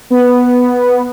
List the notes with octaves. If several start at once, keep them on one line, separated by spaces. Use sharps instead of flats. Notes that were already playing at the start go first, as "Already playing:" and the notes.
B3